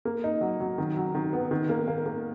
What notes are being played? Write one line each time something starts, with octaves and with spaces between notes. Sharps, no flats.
A#3
D#4
F#3
F#3
D#3
F#3
D#3
B3
D#3
A#3
A#3
A#3